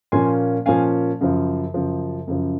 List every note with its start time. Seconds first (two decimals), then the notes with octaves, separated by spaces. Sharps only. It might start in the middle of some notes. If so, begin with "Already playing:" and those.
0.12 A#2 F3 A#3 C#4 G#5 C6
0.66 A#2 F3 A#3 C#4 F5 G#5
1.21 F#2 C#3 F3
1.74 F#2 C#3 F3
2.27 F#2 C#3 F3